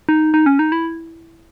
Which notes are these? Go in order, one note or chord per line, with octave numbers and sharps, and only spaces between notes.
D#4
D#4
C#4
D#4
E4